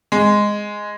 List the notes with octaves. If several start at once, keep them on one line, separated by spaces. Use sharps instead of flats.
G#3